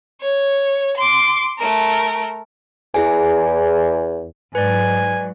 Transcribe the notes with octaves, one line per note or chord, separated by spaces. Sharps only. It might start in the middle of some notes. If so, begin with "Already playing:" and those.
C#5
C6 D6
A3 A#4
E2 E4 G#4 G#5
G#2 F#3 B4 D5 G#5